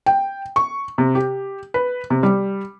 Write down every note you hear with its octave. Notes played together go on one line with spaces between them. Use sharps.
G5
C#6
C3
G4
B4
C3
G3